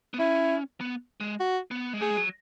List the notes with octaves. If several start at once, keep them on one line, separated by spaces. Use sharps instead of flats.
B3
C#4 E4
B3
G#3
F#4
B3
G#3
A3 G#4
G#3
F#3